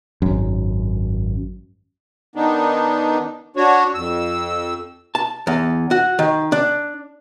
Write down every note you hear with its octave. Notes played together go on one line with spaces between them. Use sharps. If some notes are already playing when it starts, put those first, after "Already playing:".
G#1 F#2
D#3 B3 D4 D#4
D4 F#4 C#5
F2 E6
A5
E2
F#4
D#3
D4